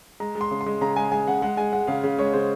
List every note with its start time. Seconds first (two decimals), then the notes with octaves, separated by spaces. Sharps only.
0.20 G#3 A#5
0.35 G#3
0.41 C6
0.51 C#3
0.61 C6
0.66 G#3
0.81 C#3 A#5
0.96 G#3 G#5
1.12 G#3 G#5
1.27 C#3 F#5
1.42 G#3 F#5
1.57 G#3 G#5
1.73 G#3 F#5
1.87 C#3 F5
2.03 C#3
2.18 G#3 C#5
2.33 C#3 C5